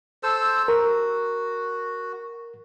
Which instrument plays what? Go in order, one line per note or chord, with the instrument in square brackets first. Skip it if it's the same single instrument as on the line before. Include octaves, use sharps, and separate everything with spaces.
[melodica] A4 C5 E6
[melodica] F#4 [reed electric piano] A#4